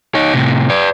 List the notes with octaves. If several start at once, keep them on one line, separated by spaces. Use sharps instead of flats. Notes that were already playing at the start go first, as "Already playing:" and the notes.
D#4 C#5
A2 C3
B4 D5